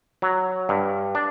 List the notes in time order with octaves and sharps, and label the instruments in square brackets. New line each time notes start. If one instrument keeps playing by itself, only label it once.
[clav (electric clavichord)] F#3
G2
D4